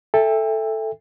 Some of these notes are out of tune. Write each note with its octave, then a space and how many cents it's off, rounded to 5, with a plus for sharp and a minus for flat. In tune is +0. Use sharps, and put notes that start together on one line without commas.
A4 +0 E5 +0 G5 +35